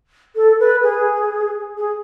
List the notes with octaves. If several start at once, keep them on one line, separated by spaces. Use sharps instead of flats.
A4
B4
G#4
G#4